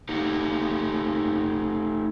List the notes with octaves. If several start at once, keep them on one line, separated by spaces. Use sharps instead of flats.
A3 D#4 G4